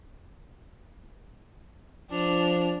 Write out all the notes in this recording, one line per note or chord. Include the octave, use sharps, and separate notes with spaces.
F3 D4 F7